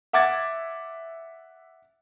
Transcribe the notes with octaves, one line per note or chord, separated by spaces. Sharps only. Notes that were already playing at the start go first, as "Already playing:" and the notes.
E5 F#5 D6 G#6 A6